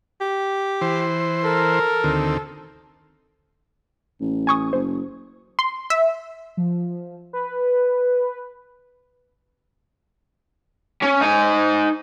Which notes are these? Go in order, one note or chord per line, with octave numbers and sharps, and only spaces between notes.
G4
E3 C5
A4 A#4
D2 D#3 C4
A1
G#5 C#6 D#6
F#1 C5
C6
E5
F3
B4
C#4
D#4 G#5